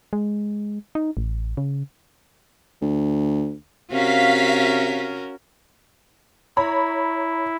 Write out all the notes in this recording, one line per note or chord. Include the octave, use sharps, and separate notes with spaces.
G#3
D#4
A1
C#3
D2
C3 C#4 F#4 A#4 F5 B6
E4 C#5 A#5 B5